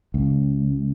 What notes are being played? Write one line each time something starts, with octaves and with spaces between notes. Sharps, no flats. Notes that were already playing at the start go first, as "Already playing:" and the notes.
C#2